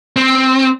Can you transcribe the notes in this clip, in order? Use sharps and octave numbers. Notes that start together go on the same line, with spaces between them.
C4